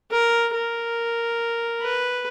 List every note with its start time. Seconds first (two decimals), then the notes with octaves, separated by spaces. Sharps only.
0.11 A#4
0.54 A#4
1.82 B4